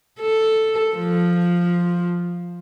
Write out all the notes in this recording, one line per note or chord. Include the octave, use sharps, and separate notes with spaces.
A4
F3